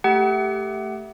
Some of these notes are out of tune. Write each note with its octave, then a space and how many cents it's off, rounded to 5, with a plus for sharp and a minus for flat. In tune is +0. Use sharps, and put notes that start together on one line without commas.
A3 +0 G4 +0 F#5 +25